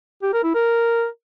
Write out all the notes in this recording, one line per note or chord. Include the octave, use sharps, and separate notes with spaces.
G4
A#4
E4
A#4